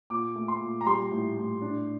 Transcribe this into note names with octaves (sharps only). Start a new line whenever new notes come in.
A#2 D6
A3
C6
A#2
A#5
G3 C6
A2
A2
D4